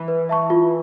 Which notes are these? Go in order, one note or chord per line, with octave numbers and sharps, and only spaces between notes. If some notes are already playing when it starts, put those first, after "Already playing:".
Already playing: E3
B4
E5 A5 C#6
F4